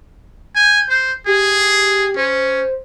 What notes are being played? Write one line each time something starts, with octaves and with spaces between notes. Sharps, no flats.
G#5 G6
C5
G4 G#4
C#4 C5